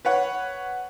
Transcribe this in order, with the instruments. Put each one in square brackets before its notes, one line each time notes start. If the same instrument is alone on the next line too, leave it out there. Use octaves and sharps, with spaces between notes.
[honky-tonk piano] B4 C#5 F#5